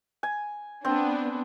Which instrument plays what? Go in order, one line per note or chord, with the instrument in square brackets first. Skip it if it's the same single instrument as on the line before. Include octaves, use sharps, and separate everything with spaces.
[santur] G#5
[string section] B3 D4 [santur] C4